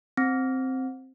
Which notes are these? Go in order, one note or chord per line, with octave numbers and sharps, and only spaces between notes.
C4